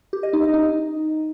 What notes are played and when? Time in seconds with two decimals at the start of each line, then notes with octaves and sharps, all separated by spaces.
0.13 G4
0.23 D#5
0.33 D#4
0.43 D#5
0.54 D#4